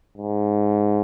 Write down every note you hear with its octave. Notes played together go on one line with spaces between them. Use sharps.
G#2